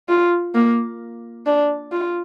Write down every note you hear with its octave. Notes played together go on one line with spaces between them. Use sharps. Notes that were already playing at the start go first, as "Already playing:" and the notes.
F4
A#3
D4
F4